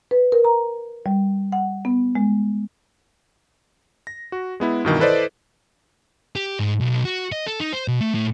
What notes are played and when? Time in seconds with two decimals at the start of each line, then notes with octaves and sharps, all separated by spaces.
0.11 B4
0.32 A#4
0.44 A#5
1.06 G3
1.52 F#5
1.85 B3
2.15 G#3
4.07 A#6
4.32 F#4
4.60 G#3 B3 E4
4.85 G2 B2 D#3 E3
4.99 E4 A4 B4 C5 D5 D#5
6.36 G4
6.59 G#2
6.81 B1
7.05 F#4
7.32 D#5
7.46 A4
7.60 D#4
7.73 C5
7.88 B2
8.00 A3
8.15 A2